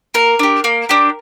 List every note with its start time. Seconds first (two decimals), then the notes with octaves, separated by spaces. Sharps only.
0.14 A#3 A#4
0.39 D4 G4
0.64 A#3
0.89 D4 G4